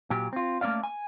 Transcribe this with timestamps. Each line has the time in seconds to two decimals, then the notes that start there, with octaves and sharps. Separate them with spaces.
0.10 A#2 F#3 G4
0.33 C4 F4
0.61 A3 A#3 C#4 D5 F5
0.84 G#5